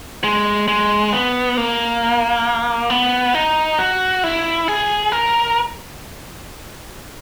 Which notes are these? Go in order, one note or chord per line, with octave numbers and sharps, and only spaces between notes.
G#3
G#3
B3
A#3
B3
D#4
F#4
E4
G#4
A#4